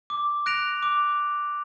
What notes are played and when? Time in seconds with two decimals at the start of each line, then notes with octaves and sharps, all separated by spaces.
0.10 D6
0.46 F#6 A#6 D7 F7
0.83 D6